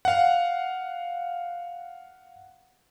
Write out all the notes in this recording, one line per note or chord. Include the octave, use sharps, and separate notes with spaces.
F5 F#5